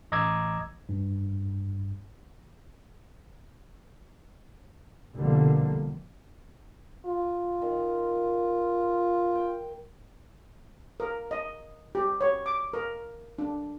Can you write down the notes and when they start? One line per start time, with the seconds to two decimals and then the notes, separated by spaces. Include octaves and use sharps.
0.12 A1 D#5 A#5 D6 E6 G#6
0.89 G2
5.15 C2 B2 D3 F3 G3 A#3
7.06 F4
7.62 D#3
9.35 G5
11.00 A#4
11.31 D#5
11.95 G4
12.21 C#5
12.46 D6
12.73 A#4
13.38 D4